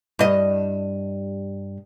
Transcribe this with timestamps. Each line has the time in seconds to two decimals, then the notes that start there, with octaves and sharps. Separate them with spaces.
0.19 G2 D#5